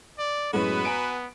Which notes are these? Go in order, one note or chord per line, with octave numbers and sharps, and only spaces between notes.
D5
F#2 A2 G#3 B3 F#4 B4
G#5 A#5 D7